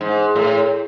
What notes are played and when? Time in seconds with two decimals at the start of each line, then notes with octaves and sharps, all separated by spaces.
0.01 G#2
0.35 A2